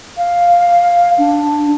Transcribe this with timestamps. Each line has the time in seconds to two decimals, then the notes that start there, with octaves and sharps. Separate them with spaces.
0.17 F5
1.18 D4